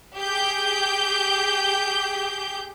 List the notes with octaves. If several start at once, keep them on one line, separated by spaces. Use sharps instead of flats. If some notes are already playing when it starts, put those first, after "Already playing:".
G4 G#4 G6